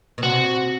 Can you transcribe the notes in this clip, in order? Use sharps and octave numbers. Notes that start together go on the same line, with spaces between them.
B2
C3 F#4